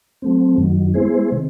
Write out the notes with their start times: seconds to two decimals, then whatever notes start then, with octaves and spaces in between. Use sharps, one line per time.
0.22 F#3 A3 C4
0.58 F#2 D#3 F#3
0.94 G#3 B3 E4 G#4 C5
1.32 C3 D#3